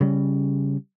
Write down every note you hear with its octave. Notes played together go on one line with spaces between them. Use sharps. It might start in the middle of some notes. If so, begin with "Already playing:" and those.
C#3 G3 C#4